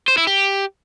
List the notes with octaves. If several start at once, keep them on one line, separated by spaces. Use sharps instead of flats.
C5
E4
G4